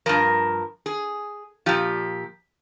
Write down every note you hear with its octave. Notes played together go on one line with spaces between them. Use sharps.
G2 F3 A#4
G#4
A#2 F3 G4